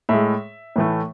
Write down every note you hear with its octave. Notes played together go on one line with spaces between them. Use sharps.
A2 G#3 E5
A2 E3 A3